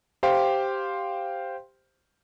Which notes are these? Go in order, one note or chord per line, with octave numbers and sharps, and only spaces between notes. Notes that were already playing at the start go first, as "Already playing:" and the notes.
G4 C5 F5 G5 C6